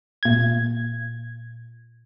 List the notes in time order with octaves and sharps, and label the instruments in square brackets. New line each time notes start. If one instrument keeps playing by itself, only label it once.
[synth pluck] A#2 G#6